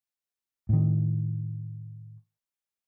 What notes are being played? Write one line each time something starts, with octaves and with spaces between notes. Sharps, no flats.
A2 D#3